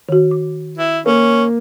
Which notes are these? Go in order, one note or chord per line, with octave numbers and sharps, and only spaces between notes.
D#3 F#4
D6
E4
A#3 C#4